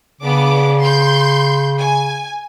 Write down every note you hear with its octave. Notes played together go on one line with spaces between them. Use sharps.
C#3 B3 D4 D6
C6 G6
G#5